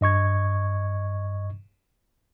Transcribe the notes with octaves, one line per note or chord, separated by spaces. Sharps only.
G2 D#5 C#6 G#6